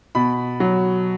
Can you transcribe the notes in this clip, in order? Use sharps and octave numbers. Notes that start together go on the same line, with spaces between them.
B2 B5
F#3